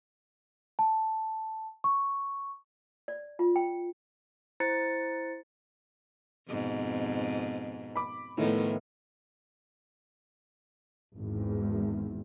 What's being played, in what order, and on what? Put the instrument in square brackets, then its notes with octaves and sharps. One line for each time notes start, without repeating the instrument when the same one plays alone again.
[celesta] A5
C#6
[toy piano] D5
F4
G5
[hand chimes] E4 C5 A#5 A6 C#7
[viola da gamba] F2 G#2 B2
[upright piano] B5 D6
[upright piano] A2 A3 B3 [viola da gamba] D#3 F3
[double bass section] G#1 E2